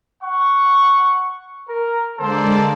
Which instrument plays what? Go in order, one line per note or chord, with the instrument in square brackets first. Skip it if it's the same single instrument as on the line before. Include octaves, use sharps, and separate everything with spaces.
[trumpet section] F#5 C#6
A#4
[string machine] D3 G#3 D5 [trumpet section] A#3 A4 C5